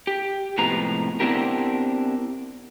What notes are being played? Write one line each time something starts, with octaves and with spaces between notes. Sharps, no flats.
G4
A2 C3 F3 G#3 B3 A#5
B3 C4 D4 E4 G4 A#4